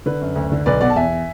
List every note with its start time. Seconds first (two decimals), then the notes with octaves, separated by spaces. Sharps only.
0.06 D3 B4
0.21 F#2
0.35 D2
0.52 D3
0.66 B1 B4 D5
0.81 B2 D5 F#5
0.90 A5
0.96 E2 E5 G#5